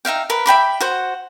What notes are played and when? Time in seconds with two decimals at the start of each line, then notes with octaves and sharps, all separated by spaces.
0.05 D#4 E5 F5 G5
0.30 A#4 B4
0.46 E5 G5 B5 D6
0.80 F#4 C5 F#5